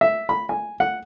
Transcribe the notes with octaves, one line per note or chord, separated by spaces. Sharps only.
E5
B5
G#5
F#5